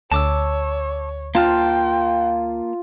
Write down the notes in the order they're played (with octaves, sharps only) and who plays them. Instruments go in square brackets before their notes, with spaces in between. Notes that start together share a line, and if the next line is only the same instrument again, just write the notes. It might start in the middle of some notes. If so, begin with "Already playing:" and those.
[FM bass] D2 [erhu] C#5 [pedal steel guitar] A5 D6 E6
[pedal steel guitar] A#3 A5 F6 [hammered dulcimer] F4 [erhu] G5